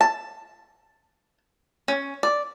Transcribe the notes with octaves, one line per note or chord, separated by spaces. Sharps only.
A5
C#4
D5